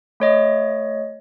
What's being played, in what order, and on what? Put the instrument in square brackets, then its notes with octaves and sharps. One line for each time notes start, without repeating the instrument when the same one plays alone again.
[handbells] A3 C#5 D#5